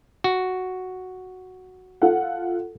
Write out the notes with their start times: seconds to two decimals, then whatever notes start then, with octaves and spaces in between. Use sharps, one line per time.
0.24 F#4
2.02 F4 A4 F#5